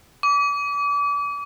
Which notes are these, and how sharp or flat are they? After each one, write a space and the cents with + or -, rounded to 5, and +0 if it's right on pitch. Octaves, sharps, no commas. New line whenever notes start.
D6 -35